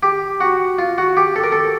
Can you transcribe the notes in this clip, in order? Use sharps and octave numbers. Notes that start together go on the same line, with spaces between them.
G4
F#4
F4
F#4
G4
A4
A#4
A4